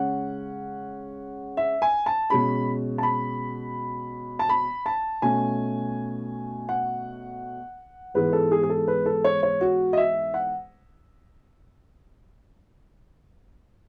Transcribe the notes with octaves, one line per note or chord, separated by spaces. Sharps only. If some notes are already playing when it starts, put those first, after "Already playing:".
Already playing: C#3 G#3 C#4 F#5
E5
G#5
A5
B2 G#3 C#4 B5
A5
B5
A5
B5
A5
B2 A3 C#4 G#5
F#5
G#2 E3 G#3 B3 B4
A4
G#4
G#4
A4
B4
A4
C#5
C#5
F#4
D#5
E5
F#5